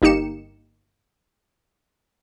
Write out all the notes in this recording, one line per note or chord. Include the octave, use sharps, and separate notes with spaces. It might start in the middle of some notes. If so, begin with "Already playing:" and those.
G1 A#3 D#4 G4 C#7 E7